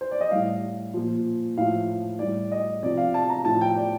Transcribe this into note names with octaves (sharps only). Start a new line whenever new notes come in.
C5
D5
D#5
A2 G3 F5
A#2 F3
A2 F3 F5
A2 G3 D5
D#5
C3 F3 D5
F5
A5
A#5
A2 F3 A5
G5
D5